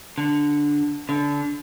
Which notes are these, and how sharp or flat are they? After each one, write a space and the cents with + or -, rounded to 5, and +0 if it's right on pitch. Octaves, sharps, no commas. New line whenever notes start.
D3 +0
D3 -25